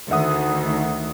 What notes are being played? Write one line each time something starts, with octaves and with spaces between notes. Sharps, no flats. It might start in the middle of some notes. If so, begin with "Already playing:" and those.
D2 D#3 E5 F#5 D#6